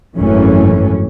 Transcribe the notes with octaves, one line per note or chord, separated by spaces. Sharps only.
G#1 F#2 E3 A3 C#4